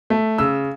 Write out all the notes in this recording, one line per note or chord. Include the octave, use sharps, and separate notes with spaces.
A3
C#3 E6